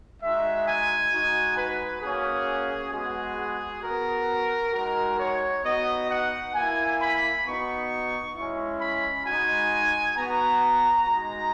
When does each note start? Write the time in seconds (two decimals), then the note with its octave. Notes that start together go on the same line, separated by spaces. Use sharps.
0.23 G#3 D#4 F#4 E5
0.67 G#5
1.12 G#3 D#4 F#4
1.58 B4
2.02 A#3 C#4 F#4 G#4
2.94 G#3 B3 F#4 G#4
3.83 B3 F#4 A#4
4.74 G#3 D#4 F#4 A#4
5.20 C#5
5.65 B3 D#4 F#4 D#5
6.10 F#5
6.55 A#3 E4 G#5
7.00 B5
7.45 B3 D#4 F#4 C#6
8.36 G#3 C#4 E4
8.81 B5
9.26 G#3 D#4 F#4 G#5
10.17 B3 F#4 A#5
11.07 G#3 D#4 F#4 A#5